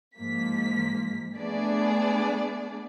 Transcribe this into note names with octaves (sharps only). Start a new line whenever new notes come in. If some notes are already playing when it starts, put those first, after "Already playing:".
G#2 F3 A#3 B6
A3 B3 D4 G#4 D5